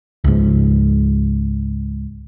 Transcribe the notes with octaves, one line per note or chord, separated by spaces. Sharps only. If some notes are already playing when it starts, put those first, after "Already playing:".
C#2 G#2